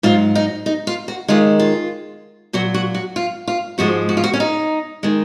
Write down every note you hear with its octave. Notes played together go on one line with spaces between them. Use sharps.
G#2 F#3 F4
D#4
D#4
F4
F#4
D#2 D#3 G#3 F4
F4
A#2 F#3 F#4
F#4
F#4
F4
F4
G#2 F3 G#3 F#4
F#4
F4
F#4
C#4
D#4
D#3 G#3